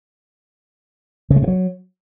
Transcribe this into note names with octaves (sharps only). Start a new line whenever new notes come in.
C#3
G#3
G2
F#3